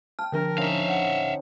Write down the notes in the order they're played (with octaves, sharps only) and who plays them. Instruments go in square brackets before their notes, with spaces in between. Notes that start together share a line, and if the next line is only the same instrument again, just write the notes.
[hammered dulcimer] G5 A5 [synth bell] F6
[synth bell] D3 F3 D4 [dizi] A#4
[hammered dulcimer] C#4 D#4 C5 [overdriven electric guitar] E5 F5
[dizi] F#5